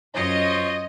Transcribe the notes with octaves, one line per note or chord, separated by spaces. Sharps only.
F#2 F4 C5 C#5 D#5